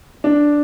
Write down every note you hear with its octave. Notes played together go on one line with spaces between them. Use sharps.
D4